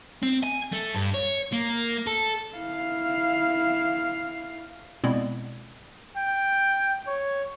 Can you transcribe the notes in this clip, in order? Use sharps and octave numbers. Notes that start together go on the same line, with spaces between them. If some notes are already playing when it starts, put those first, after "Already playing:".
C4
G#5
A3
G2
C#5
A#3
A4
E4 F5
B2 G#3 B3 C4 E4 D5
G5
C#5